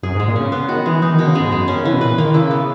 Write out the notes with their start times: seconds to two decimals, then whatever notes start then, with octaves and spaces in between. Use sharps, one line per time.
0.03 F#2 G#4
0.15 G#2
0.20 G#3
0.28 A#2
0.36 C#3 C#4
0.52 C#3 B3
0.68 D#3 F#4
0.86 E3 G#3
1.02 E3 D#4
1.14 D#3
1.19 B2
1.27 C#3
1.35 G#2 G#3
1.47 G#2
1.52 F#2 G#3
1.68 C#4
1.75 D#3
1.84 C#3 E3
1.93 B2
2.01 A#2 B4
2.18 D#3 A#3
2.34 C#3 E4
2.51 B3